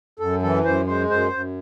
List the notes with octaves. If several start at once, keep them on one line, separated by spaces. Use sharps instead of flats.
F#2 A4
E3 A4
F#2 C5
G#3 C5
F#2 C5
F#2